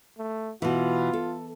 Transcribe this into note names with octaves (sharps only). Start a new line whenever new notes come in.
A3
B2 E3 F4
A4